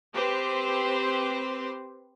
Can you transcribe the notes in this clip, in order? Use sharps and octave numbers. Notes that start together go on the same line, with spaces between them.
C4 G4 B4 C5